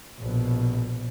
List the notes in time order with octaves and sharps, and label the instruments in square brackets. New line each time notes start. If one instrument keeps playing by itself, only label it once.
[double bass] A#1 B2